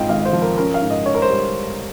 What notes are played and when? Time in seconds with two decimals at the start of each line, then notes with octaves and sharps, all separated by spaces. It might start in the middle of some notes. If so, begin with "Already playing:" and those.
Already playing: G#2 C4 F4 D#5 G5
0.09 G#1 F5
0.25 C5
0.33 F3
0.42 A#4
0.58 C#4 A#4
0.74 F5
0.82 G#2
0.90 D#5
1.05 C#4 C#5
1.15 A#4
1.22 C5
1.30 G3